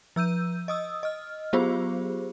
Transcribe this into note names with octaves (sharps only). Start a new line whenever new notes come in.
F3 E6 G6 D#7
D#5 D#6 E6
D#5 F6
F#3 B3 F4 G4 G#4 C5